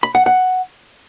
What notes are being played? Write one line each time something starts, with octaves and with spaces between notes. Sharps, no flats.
B5
F#5
F#5